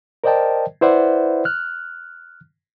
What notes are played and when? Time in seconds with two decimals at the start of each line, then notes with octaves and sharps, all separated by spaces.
0.24 A#4 C5 D5 D#5 G5 A5
0.81 E4 B4 C5 D5 E5 F#5
1.45 F6 F#6